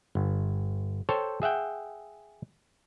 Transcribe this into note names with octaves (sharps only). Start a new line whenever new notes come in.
G1
A4 C5 C#5 G5 A5
G#4 E5 F#5 G5